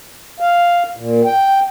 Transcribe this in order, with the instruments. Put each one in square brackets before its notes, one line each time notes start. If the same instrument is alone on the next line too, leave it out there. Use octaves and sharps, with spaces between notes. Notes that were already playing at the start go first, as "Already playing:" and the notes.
[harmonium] F5
A#2
G5